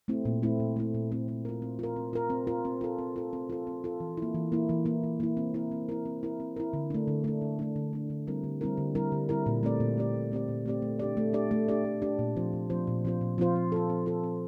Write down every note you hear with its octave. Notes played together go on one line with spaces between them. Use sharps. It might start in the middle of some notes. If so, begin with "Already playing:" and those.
A3 C4 E4
A#2
A3 C4 E4
A#2
A3 C4 E4
A#2
A3 C4 E4
C4
F4 A#4
C4
F4 A#4
C4
F4 A#4
C4
F4 A#4
C4
F4 A4
C4
F4 A4
C4
F4 A4
C4
F4 A4
E3
A#3 E4
E3
A#3 E4
E3
A#3 E4
E3
A#3 E4
C4
E4 A#4
C4
E4 A#4
C4
E4 A#4
C4
E4 A#4
D3
A3 D4
D3
A3 D4
D3
A3 D4
D3
A3 D4
D3
G3 C4 E4 A#4
D3
G3 C4 E4 A#4
D3
G3 C4 E4 A#4
D3
G3 C4 E4 A#4
A#2
A3 C4 G4 D5
A#2
A3 C4 G4 D5
A#2
A3 C4 G4 D5
A#2
A3 C4 G4 D5
A3
D4 G4 D5
A3
D4 G4 D5
A3
D4 G4 D5
A3
D4 G4 D5
A#2
F3 C4 F4 C5
A#2
F3 C4 F4 C5
A#2
F3 C4 F4 C5
A#2
F3 C4 F4 C5
C4
F4 A4
C4
F4 A4
C4